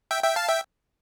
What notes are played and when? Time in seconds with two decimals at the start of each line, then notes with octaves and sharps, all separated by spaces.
0.11 E5 G5
0.23 E5 G5
0.36 F5 A5
0.49 E5 G5